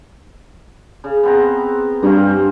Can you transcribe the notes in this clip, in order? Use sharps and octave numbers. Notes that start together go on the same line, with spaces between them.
C#3
B3 C4 A#5
G2 A#3 C4 C#4